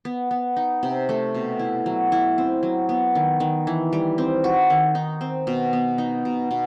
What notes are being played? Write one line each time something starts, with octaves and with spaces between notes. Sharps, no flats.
B3
B3
D#4
C3
A3
B2
E4
F#3
E4
C4
F#3
B3
D#3
D#3
E3
G3
C4
F#4
D#3
D#4
C4
B2
B3
D#4
B2
B2